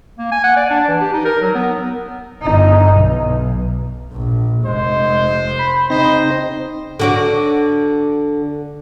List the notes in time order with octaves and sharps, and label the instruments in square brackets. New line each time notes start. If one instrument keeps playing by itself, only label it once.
[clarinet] A#3
G#5
F#5
D5
D4
E3
G4
D#4
A#4
F#3
B3
[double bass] G1 D#4
B1
A#1
[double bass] F1 [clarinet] G#3 [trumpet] C5
[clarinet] B5
[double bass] C#3 [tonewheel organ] C4 D#4 A#6 [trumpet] C5 [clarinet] D#5
[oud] D3 F#4 D5